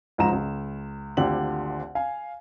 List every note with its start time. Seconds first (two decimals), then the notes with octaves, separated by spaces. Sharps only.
0.18 C#2 G#2 F3 A#5 E7
0.33 C#2
1.17 G#1 D2 D3 F4 G4 F#7
1.95 F5 G#5